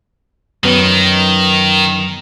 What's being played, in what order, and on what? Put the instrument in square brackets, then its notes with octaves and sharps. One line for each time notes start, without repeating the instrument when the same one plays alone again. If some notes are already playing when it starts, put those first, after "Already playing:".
[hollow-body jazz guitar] F#2 B3 [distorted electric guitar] D#3